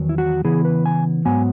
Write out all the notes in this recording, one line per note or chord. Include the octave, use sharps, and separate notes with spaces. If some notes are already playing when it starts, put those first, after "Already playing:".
Already playing: E2 D#3 F#3
E4
F#4
C#3 E3 B3 E4 G#4
B4
G#5
G#2 F#3 B3 G#5